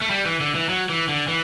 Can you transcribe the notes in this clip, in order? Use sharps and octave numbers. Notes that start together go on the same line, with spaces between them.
A3
G3
E3
D3
E3
F#3
E3
D3
E3